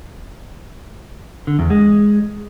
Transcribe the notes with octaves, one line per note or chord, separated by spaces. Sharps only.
D3
E2
G#3